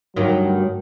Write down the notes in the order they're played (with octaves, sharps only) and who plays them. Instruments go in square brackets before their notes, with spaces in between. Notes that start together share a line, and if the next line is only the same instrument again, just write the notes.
[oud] D2 G2 D#3 [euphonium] F#3